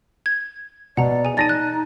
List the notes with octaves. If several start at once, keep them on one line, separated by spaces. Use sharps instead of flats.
G#6
B2 D5 F#5 A#5
G#4 G#5
D#4 D5 A5 A6 A#6 D#7
F#6